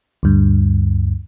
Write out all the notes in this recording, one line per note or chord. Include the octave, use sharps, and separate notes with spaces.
D2 G2